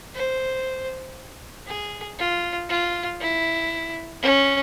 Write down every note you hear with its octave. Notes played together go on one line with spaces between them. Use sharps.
C5
G#4
F4
F4
E4
C#4